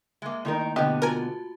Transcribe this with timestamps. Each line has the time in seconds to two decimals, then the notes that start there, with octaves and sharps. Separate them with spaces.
0.22 G#3 A#3 E5
0.45 D#3 A3 A#3 D#4 E4 A#4
0.76 B2 D3 B3 G4 D#5
1.02 F4 F#4 A#4 G#5 A5